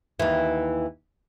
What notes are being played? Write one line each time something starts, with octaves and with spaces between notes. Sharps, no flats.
D#2 E3